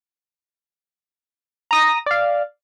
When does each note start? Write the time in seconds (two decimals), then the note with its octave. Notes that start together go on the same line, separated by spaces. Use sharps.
1.71 A#5 D#6 A#6
2.06 D5 F5